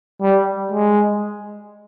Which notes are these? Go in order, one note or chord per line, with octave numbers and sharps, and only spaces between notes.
G3
G#3